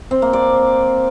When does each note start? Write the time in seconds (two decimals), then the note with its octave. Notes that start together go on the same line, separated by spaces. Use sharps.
0.11 C4
0.22 A#3
0.33 D5